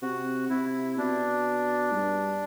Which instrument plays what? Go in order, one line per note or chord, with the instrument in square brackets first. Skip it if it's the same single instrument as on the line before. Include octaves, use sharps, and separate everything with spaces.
[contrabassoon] C3 [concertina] F#4
[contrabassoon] C3 [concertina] E4
[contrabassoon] B2 [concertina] D4
[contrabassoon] G2